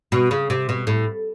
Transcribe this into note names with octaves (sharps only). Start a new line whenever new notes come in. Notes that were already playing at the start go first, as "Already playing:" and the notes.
B2
C#3
C3
B2
A2